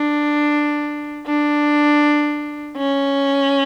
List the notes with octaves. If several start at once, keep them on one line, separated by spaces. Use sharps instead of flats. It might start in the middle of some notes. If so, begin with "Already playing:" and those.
Already playing: D4
D4
C#4